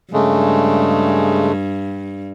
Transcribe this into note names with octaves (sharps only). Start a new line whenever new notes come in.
G2 C#3 G#3 A3